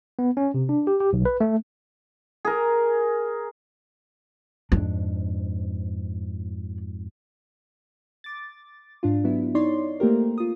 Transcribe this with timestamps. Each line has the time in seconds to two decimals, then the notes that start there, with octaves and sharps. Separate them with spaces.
0.19 B3
0.37 C#4
0.54 C3
0.69 D4
0.87 G4
1.00 G4
1.13 B1
1.25 B4
1.41 A3
2.45 G#4 A#4
4.72 F2 G#2 D4
8.24 D6 A6
9.03 G#2 D4 F4
9.24 F#3 B3 E4
9.55 D#4 C#5 D5 C6
10.00 A3 A#3 C4 G4 A#4
10.38 F4 D#6